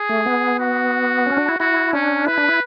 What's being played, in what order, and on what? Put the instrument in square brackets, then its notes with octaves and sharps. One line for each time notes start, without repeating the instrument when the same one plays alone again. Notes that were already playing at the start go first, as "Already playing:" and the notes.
Already playing: [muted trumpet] G#4
[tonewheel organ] A3
B3
[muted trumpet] F#4
[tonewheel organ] C#4
D4
E4
[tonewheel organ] E4 [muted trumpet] F#4
[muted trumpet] C#4 [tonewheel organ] D4
[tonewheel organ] E4 [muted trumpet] B4
[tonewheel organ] D4
E4